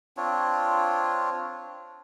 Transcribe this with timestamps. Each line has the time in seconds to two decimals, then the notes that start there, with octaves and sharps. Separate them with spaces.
0.17 C4 D4 F4 C#5